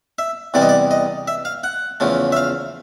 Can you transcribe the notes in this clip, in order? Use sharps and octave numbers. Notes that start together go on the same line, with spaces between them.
E5
E2 C3 E3 G3 D5
D#5
D5
D#5
E5
F5
F#5
E2 C#3 F3 A3
E5
F5